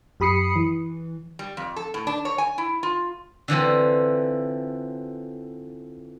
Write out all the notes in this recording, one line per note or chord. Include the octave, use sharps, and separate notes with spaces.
F#2 G4 B5 D#6 C7 C#7
E3
G3
F2
A4
A2
D4
C#5
G#5
E4
F4
D3 E3 F3 C4